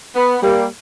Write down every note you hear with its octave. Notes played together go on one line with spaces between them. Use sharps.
B3
G3 A#3